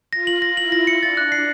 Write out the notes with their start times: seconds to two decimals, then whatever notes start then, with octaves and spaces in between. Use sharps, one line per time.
0.13 F4 A#6
0.27 F#7
0.42 A#6
0.57 E4 F#7
0.72 A#6
0.87 C#7
1.02 D4 A6
1.17 F#6
1.32 C7